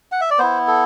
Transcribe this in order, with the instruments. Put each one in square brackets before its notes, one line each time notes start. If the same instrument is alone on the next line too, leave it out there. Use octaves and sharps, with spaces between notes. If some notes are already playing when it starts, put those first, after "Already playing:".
[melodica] F#5
E5
D5
B3 E4 C5
A4